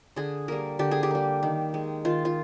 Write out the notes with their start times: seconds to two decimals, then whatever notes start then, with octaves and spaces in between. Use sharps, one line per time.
0.16 D3 G#4
0.48 G3 A#3 A#4
0.79 D3 G4
0.91 G#4
1.03 G4
1.11 G3 A#3
1.43 D#3
1.74 G#3
2.05 D#3 F4
2.25 F4